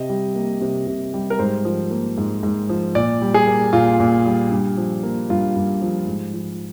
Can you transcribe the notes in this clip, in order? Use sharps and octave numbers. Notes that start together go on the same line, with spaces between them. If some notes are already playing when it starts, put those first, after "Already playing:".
Already playing: C3 D#5
G3
A#3
C3
C3
G3
A#4
G#2 C5
F3
A#3
G#2
G#2
F3
A#2 D5
G3
G#4
A#3
A#2 F4
A#2
G3
G2
F3
A#3
G2 F4
G2
F3
G#2
F3